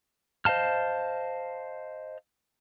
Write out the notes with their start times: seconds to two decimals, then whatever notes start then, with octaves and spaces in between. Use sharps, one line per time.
0.45 C5 D#5 F5 A5 F6